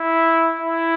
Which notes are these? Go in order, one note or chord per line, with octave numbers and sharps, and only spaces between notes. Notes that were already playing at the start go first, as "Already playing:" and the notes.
Already playing: E4
E4